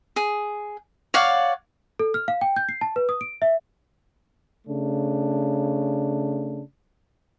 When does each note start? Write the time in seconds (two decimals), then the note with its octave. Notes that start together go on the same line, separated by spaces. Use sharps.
0.16 G#4
1.14 C#5 D5 F5 F#5
1.99 A4
2.14 F6
2.28 F5
2.41 G5
2.56 G6
2.69 C7
2.81 A5
2.96 B4
3.09 D#6
3.21 D7
3.42 E5
4.66 C#3 A3 D4